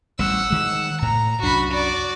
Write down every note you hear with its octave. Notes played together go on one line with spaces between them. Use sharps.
A1 G3 F#5 E6
D#3 G#3
A2 A#5
C2 F#2 D4 F#4 B5
F#4 D5